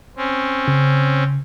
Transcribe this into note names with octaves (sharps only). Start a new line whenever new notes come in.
C4 C#4
C#3